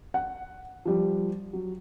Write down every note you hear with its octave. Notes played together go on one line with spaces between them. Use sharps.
F#5
F3 G3
F#3